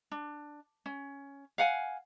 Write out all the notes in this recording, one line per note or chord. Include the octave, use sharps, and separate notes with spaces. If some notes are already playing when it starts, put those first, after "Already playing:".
D4
C#4
F5 F#5 G#5